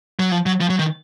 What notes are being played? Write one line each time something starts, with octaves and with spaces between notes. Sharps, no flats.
F#3
F3
F#3
F3
F#3
D#3